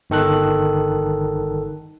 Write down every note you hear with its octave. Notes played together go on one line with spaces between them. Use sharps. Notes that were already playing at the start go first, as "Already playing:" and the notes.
G1 D#3 A4 F#6